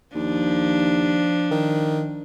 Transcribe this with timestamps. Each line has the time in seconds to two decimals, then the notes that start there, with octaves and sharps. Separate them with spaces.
0.15 D#2 F3 D4
1.51 D#3